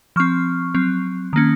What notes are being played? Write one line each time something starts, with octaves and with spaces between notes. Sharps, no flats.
F3 C4 C#6 F6
F#3 C4
D#3 A#3 C#4